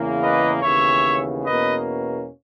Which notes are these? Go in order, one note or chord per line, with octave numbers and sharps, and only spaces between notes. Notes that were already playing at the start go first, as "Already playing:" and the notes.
Already playing: E2 C#3 E3 A#3
B4 D#5
D#2 C#3 E3 B3 C#5 E5
E2 B2 A#3 C#4 B4 D#5